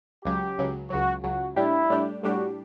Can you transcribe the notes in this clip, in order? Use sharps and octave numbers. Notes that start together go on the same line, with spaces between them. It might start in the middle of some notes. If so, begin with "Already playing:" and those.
C#2 C#3 F#3 G4
C#2 C#3 F#3
C#2 C#3 F#3 F#4
C#2 C#3 F#3 F#4
A2 G3 D4 E4 G4
A2 G3 D4 G4
A2 G3 D4 F#4 G4